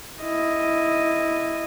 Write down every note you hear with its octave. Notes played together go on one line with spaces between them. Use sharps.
E4 D#5